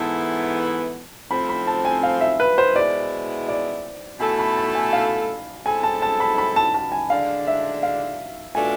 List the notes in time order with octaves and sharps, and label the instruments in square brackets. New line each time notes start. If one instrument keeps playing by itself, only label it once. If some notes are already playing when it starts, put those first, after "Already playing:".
Already playing: [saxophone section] G#2 E3 B3 E4 A4 [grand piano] A5
[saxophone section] F3 A3 C4 [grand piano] B5
[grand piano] B5
A5
G#5
F5
E5
B4
C5
[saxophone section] B2 G#3 B3 E4 [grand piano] D5
[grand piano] D5
[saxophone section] B2 A3 E4 A4 [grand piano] G#5
[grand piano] B5
A5
G#5
F5
[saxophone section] B2 G#3 C4 E4 A4 [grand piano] G#5
[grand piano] A5
A5
B5
B5
A5
A5
G#5
[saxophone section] D3 G#3 D4 [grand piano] F5
[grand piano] E5
F5
[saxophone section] B2 A3 D4 F4 [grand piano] G#5